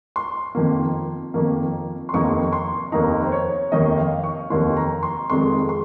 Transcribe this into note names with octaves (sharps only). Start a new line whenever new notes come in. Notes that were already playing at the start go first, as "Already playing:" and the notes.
C6
F2 D#3 A#3
F2 D#3 A#3
C6
F1 D#2 D#3 A#3 D#4 C#6
C6
F1 D#2 D#3 A#3 D#4 A#5
C5
C#5
F1 D#2 D#3 A#3 D#4 D#5
F5
C#6
F1 D#2 D#3 A#3 D#4 C6
A#5
C6
F1 F2 D#3 G#3 C6
C6